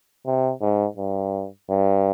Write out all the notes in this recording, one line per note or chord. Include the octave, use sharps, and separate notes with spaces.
C3
G#2
G2
G2